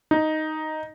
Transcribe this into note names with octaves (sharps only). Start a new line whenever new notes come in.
D#4